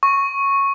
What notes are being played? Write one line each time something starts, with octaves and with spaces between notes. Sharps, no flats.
C#6